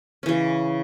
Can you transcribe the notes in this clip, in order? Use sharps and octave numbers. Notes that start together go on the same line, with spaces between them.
C#3 E3 C#4